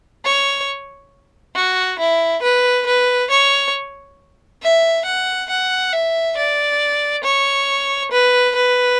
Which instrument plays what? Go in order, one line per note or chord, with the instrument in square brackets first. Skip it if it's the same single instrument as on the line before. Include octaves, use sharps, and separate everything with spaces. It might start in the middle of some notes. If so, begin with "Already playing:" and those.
[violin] C#5
F#4
E4
B4
B4
C#5
E5
F#5
F#5
E5
D5
C#5
B4
B4